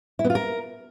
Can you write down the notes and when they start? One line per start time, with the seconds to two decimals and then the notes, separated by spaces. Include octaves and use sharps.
0.19 E4
0.24 B3
0.30 F4
0.35 A#4